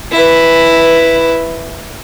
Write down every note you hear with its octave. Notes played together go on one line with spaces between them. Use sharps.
E4 B4